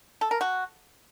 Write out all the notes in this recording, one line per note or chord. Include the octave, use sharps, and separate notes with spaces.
A4
A#4
F#4